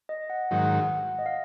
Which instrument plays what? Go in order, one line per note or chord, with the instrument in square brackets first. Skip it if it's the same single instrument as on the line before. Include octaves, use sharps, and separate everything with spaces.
[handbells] D#5
F#5
[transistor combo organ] G#2 D#3 F#3 [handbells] F#5
[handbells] D#5
F5